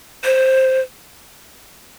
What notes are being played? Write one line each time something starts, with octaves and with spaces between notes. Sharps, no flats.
C5